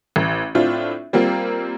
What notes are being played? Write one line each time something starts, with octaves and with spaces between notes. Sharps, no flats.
A1
A2 C4 D4 F4
G3 A#3 C4 F4